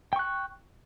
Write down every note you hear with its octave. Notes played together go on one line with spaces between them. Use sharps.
G5 C#6 F#6